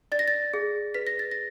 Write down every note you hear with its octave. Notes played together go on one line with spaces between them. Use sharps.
D5 A6
A#6
A6
G#4
B4 B6
A#6
A6
A#6